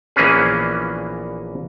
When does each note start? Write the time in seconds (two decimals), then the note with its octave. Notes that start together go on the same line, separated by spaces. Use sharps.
0.16 A#1 E3 A#3 B3 C#4 G#4